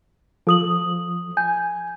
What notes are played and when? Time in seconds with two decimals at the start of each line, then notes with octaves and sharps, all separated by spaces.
0.47 F3 A4 D#6 F#7
1.37 G#5 G6